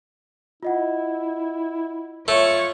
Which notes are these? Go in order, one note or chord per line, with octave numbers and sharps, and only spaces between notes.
E4 F4 D#5 F#5
A3 F4 C#5